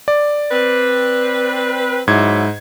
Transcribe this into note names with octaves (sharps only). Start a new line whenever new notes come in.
D5
C4 B4
G#2 F#3 E4 G#6